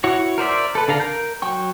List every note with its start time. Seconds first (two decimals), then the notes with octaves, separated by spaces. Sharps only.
0.04 E4 F#4 C#5
0.38 A#4 C5 D5 E5
0.75 A4 B4
0.88 D3 A4 F5 A#5
1.00 A#4 A#5 G6
1.42 F#3 G5 C#6